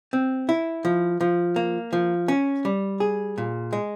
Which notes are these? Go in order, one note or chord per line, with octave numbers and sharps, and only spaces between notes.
C4
E4
F3
F3
A#3
F3
C#4
G3
G#4
A#2
G#3